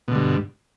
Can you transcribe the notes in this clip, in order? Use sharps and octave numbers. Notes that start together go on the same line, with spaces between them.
G2 B2 D3